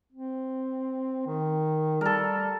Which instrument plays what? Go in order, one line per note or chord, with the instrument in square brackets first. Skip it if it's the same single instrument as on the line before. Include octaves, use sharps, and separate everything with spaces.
[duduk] C4
D#3
[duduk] G3 [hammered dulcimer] A4 A#4